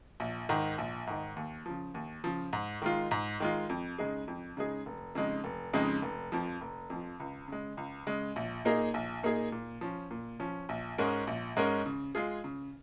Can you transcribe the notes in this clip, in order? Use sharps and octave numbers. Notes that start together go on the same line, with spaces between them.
A#1
G#2 D#3
A#1
G#2 D#3
D#2
C#3 F3
D#2
C#3 F3
G#2
D#3 G#3 F4
G#2
D#3 G#3 F4
F2
C#3 G#3 D#4 G#4
F2
C#3 G#3 D#4 G#4
F1
F2 C#3 G#3 D#4
F1
F2 C#3 G#3 D#4
F1
F2 F3
F1
F2 F3
C#2
C#3 G#3
C#2
C#3 G#3
A#1
A#2 A#3 D#4 G#4
A#1
A#2 A#3 D#4 G#4
A#2
F3 C#4
A#2
F3 C#4
A#1
G#2 G#3 C#4 A#4
A#1
G#2 G#3 C#4 A#4
C#3
G#3 F4 G#4
C#3